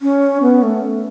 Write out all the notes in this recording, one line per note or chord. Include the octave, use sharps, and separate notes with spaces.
C#4
B3
A3